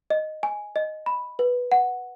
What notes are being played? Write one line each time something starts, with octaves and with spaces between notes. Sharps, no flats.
D#5
G#5
D#5
B5
B4
F#5